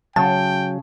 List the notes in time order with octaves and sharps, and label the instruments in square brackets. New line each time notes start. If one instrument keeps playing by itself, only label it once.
[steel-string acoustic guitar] C#3 [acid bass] F#3 [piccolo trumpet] G5 [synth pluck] A5